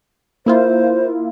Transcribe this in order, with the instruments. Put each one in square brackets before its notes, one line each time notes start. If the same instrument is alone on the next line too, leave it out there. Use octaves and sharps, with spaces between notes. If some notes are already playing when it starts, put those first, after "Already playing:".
[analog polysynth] A#3 E4 F4 [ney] C5